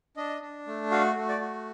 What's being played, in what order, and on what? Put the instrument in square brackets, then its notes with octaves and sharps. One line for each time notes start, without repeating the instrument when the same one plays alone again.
[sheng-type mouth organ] D4 D#5
D4
A3
F#4 F5
A3
D5
F#4